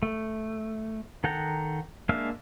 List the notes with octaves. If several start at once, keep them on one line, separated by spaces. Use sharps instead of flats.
A3
D#3 A4 F#5 G5 A#5
G#3 A#3 D4 E5 F5